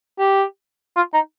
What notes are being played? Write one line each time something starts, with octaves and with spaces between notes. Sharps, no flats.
G4
F4
D#4